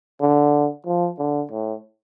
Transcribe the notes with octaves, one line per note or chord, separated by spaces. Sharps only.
D3
F3
D3
A2